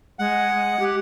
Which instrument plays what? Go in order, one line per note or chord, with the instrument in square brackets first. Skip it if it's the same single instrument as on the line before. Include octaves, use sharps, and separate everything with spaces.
[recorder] G#3 [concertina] F#5
[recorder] G4